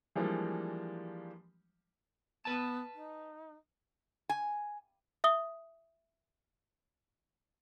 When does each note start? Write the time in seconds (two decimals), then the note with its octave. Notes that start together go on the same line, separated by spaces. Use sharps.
0.15 E3 F3 G3 G#3 A#3 D4
2.45 B3 B4 A5
2.94 D#4
4.29 G#5
5.24 E5 D#6 G7